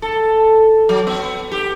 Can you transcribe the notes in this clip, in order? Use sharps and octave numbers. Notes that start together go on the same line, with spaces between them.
A4
F#3
B3
G4